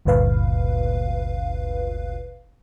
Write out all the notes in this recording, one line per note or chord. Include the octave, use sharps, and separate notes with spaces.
G1 D2 G2 A#2 B4 F5